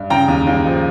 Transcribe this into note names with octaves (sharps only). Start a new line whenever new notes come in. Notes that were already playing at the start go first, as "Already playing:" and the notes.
Already playing: G2
C#3 G5 A#5
D#2
D#2
F3